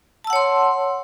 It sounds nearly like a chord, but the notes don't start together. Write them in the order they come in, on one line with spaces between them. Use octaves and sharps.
A5 E6 F#5 C#5 C6